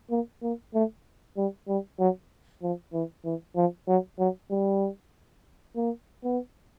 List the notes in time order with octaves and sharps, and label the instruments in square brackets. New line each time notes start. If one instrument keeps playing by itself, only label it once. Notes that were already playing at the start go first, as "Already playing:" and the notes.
[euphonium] A#3
A#3
A3
G3
G3
F#3
F3
E3
E3
F3
F#3
F#3
G3
A#3
B3